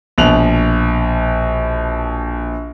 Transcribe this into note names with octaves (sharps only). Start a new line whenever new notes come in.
A#1 B2 F7 F#7